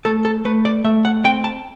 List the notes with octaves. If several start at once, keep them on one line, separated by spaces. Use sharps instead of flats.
A3 A4
A4
A3 B4
D5
A3 E5
F#5
C4 G5
A5